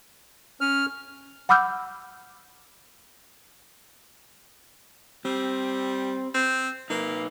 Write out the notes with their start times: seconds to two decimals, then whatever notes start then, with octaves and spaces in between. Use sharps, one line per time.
0.61 C#4 F6
1.49 F#5 B5 D6 E6 F6 G6
5.25 G3 C4
6.34 C4
6.90 A#3 D#4 B4